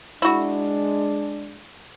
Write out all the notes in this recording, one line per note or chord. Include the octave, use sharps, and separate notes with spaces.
G#3 D4 E4 F#4